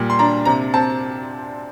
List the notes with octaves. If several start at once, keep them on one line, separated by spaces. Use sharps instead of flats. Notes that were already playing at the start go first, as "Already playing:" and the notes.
Already playing: A#2 G3
C6
D4 A#5
C3 A#5
C4 A5